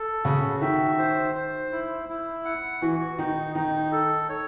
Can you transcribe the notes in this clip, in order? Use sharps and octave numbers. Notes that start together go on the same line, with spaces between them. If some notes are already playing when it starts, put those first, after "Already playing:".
Already playing: A4
C#3 F#4
D#3 E5
C5
C5
E4
E4
F#5
E3 F#4
D#3 D#4
D#3 D#4
A4
C#5